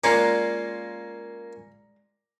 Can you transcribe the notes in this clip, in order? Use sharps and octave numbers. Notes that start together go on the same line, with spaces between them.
G#3 A#3 C#4 F4 D5 A#5